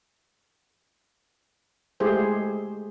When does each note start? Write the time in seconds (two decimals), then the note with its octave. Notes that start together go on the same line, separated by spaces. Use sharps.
2.00 G#3 A3 E4 G4 G#4 C5